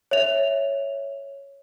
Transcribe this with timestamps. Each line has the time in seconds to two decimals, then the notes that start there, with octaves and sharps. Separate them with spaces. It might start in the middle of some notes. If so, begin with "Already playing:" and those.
0.11 C#5 E5 F7